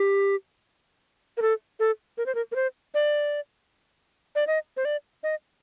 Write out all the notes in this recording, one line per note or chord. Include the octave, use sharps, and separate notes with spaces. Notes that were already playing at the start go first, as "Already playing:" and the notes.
Already playing: G4
A#4
A4
A4
A#4
C5
A#4
A#4
C5
D5
D5
D#5
C5
D5
D#5